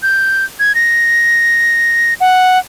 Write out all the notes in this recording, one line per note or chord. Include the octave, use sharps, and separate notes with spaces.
G6
G#6
A#6
F#5